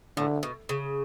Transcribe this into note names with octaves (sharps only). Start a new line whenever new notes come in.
A2 D3
B2
C#3